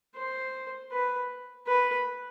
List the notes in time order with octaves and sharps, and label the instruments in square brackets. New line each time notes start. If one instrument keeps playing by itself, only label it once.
[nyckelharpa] C5
B4
B4